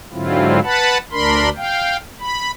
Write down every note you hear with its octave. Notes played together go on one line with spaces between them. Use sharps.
G#2 D3 F#3 C4 E4 F4
B4 F#5 A5 B5
D2 D4 A#4 B5 C6
F5 G5
B5